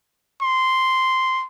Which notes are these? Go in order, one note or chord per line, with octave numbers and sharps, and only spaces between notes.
C6